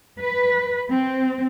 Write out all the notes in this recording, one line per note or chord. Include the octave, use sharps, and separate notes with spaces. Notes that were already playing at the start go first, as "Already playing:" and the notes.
B4
C4